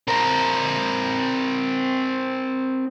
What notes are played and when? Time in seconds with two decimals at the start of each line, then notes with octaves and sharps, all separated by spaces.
0.08 C4 A#4